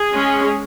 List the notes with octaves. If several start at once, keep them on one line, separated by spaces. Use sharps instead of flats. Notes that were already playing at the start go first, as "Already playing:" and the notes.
Already playing: G#4
G#3 C#4